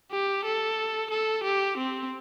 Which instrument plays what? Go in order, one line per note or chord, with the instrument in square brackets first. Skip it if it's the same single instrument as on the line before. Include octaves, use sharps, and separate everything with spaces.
[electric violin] G4
A4
A4
G4
C4